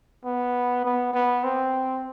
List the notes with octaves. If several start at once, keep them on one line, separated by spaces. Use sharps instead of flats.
B3
B3
B3
C4